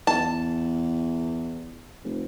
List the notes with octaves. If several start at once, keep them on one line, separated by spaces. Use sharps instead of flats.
E2 A5
F1